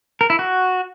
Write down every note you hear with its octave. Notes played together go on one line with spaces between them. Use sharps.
A#4
E4
F#4